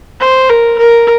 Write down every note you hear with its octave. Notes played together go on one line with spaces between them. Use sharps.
C5
A#4
A#4